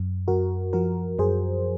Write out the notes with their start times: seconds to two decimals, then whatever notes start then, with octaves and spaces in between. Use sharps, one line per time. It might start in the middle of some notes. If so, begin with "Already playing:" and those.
Already playing: F#2
0.28 F#2 F#4 A#4
0.73 F3 F#4 A#4
1.19 F#2 G#4 C5